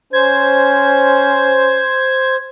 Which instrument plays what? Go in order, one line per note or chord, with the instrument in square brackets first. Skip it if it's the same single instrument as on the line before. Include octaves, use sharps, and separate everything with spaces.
[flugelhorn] C#4 [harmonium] C5 [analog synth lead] G#6